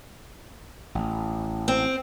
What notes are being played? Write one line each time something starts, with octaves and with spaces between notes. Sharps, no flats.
A1
C4